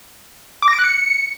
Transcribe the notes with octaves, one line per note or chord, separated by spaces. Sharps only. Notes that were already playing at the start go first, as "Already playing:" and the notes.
D6
A#6
D7
F#6
C#7